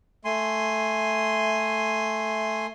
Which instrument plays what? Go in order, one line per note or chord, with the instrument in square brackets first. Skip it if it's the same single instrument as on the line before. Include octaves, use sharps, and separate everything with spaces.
[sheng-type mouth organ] A3 G#5 C6